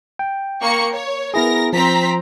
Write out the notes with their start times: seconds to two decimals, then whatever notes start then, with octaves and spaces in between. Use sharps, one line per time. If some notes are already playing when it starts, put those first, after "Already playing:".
0.19 G5
0.61 A#3 C#6 C#7
0.94 C#5
1.34 B3 E4 G#4 A#4 A#6
1.73 F3 C4 A#5 B6